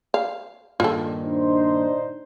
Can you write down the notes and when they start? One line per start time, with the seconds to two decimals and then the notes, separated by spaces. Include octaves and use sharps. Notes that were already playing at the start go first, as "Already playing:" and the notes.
0.14 F5
0.80 G2 A#2 D#3 F4 A4
1.24 D4 D#4 C5